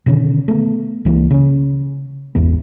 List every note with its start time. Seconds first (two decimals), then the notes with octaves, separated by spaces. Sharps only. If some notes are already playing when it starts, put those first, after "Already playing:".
0.06 B2 D3 D#3 C#4
0.48 A3 B3
1.05 C#2 E3 G3 A#3
1.31 C#3 C#4
2.35 G#1 E2 E3 B3